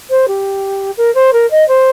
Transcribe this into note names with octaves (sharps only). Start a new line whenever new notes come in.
C5
G4
A#4
C5
A#4
D#5
C5